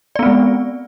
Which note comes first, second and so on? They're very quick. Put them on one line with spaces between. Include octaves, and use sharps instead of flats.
D5 B3 C4 G#3